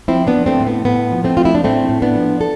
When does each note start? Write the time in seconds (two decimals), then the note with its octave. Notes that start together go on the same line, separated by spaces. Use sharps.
0.08 F3 C4 E4
0.27 B3 D4
0.34 F3
0.46 A3 C4
0.60 A2
0.67 B3
0.85 A2 B3
1.11 F3
1.24 A3 C4
1.37 F3 F4
1.45 E4
1.55 D4
1.64 A2 A3 C4
1.89 A2
2.02 B3 D4
2.16 F3
2.41 A4